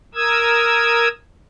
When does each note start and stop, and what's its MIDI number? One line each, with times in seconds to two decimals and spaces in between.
0.15 1.08 70
0.15 1.08 87
0.15 1.08 88
0.15 1.08 92